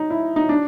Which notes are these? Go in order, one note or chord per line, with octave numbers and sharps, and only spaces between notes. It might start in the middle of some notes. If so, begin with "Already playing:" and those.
Already playing: D#4
E4
D#4
D4